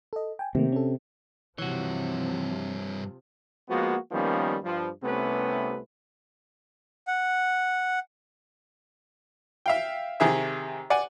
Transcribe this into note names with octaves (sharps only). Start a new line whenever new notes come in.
A4 D#5
G5 G#5
C3 D#3 A3 A#3
C#4 A4
G2 C3 E3 F3 F#4 C#5
F3 G#3 A#3 B3 F#4
D#3 F3 G3 A#3 B3 C#4
G2 F3
C2 C3 A3 B3 C#4 B4
F#5
E5 F5 G5
C3 D#3 G#4 E5
D5 F#5 G#5